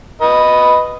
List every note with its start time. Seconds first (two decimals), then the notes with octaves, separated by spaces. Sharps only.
0.22 B4 D#5